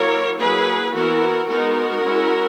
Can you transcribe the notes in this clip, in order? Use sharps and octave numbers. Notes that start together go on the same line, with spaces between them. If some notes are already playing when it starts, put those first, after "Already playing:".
Already playing: F#3 A#3 E4 A#4 C#5
F#3 A#3 E4 G#4 B4
E3 B3 E4 F#4 A#4
G#3 B3 D#4 F#4 A#4
G#3 C#4 E4